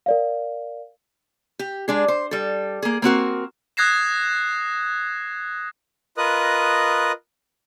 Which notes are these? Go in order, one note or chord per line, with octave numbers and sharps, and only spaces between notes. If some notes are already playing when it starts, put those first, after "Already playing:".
A#4 D5 F5
G4
G#3 D4 G#4
C5
G3 A4
A#3 G#4
A#3 C4 F#4 A#4
D#6 F#6 G#6 A#6 C7 E7
F4 A#4 B4 D#5 D#6 F#6